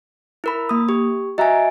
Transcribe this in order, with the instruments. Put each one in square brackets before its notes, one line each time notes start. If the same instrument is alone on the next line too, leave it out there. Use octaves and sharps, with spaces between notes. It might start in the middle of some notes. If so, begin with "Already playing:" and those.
[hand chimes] E4 A#4 B5
A#3 D#6
G4
[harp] F#4 E5 A#5 [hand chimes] D#5 G#5